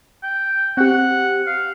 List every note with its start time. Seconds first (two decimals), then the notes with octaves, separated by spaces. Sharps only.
0.23 G5
0.77 C4 G4 F#5
1.46 F5